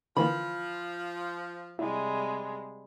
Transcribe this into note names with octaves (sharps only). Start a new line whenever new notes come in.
D3 E3 F3 A#3 B5
C3 G3 G#3 E4